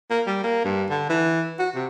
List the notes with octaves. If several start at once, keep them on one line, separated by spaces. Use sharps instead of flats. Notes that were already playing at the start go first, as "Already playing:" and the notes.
A#3
G3
A#3
G2
D3
E3
F#4
C3